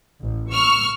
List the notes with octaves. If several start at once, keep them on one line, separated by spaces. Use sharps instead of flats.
A1
C#6 E6 F6